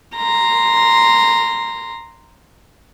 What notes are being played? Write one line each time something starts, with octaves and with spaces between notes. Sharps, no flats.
A#5 C6